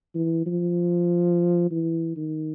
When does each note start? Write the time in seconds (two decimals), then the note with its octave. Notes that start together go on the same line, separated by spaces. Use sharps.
0.15 E3
0.46 F3
1.71 E3
2.17 D#3